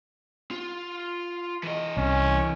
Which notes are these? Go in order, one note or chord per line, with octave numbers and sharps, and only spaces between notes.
F4
E3 D#5
C2 C#4